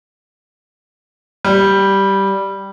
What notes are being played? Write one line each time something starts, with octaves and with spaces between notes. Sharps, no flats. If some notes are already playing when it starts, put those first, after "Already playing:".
G3